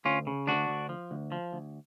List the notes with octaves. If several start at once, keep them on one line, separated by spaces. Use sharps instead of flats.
D2 C#4 F4
C#3
D2 D4 F#4
D2
F3
D2
F3
D2